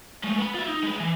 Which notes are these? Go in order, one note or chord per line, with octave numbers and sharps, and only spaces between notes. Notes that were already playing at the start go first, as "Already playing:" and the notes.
G#3 A3
B3 B5
F4 E5
D#4
G#3 B4
E3